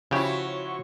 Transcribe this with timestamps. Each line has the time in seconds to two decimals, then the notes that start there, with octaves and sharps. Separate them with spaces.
0.11 C#3 F3 E4 F#4 G4 C#5 C#6